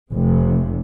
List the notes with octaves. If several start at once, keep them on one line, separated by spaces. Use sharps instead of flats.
F1 C3